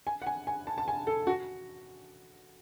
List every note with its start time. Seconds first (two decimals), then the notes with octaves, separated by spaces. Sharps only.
0.07 G#5
0.22 F#5
0.27 G#5
0.47 G#5
0.67 A5
0.78 A5
0.88 G#5
1.07 A4
1.27 F#4